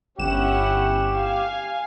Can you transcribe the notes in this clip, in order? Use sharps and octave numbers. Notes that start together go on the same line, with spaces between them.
G1 C#4 E4 G4 F#5 E7
F5 G#5